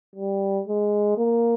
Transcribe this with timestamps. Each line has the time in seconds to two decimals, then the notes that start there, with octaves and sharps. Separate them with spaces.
0.16 G3
0.67 G#3
1.18 A#3